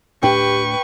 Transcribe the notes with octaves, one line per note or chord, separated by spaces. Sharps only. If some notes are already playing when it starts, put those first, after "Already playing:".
D2 A2 D4 G4 B4 G5 C#6